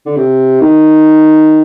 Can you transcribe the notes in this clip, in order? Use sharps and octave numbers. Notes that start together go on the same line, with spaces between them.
D3
C3
D#3